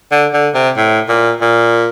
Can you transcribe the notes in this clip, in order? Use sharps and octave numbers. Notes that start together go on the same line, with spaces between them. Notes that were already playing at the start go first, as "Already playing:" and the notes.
D3
D3
C3
A2
A#2
A#2